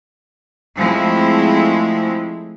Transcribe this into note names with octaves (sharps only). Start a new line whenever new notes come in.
F3 G#3 A3 C4 E4